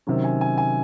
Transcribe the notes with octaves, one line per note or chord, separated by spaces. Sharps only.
C3 D#3 F#3 C#4
G#5
G#5
G#5